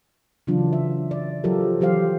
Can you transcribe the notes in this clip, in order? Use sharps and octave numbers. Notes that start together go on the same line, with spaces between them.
C#3 E3 F#3 D4 F4
E5
D5
F3 F#3 F4 G4 A4 A#4
E3 F#3 G4 C5 F5